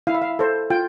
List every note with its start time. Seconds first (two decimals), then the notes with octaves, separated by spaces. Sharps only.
0.07 E4 F5
0.15 E5
0.22 F5
0.39 A4 C5
0.70 F4 G5